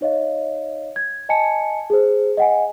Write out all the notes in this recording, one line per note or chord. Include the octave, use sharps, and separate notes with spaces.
D#4 C#5 D#5 F5
G#6
D#5 G#5 A5 C#7
G#4 C5
D#5 F#5 G#5